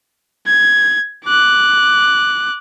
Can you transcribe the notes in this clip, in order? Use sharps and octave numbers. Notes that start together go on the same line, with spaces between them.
G#6
D6 F#6